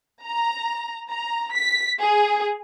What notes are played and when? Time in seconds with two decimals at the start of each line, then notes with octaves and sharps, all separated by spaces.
0.23 A#5
1.10 A#5
1.52 B6
2.00 G#4